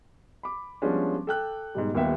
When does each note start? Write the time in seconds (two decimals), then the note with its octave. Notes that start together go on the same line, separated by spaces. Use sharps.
0.43 B5 D6
0.82 F3 G3 G#3 B3 C#4 D4
1.27 A4 G5 F#6
1.75 G#2 B2 G3
1.94 D#1 D#2 A#3 B3 E5 G5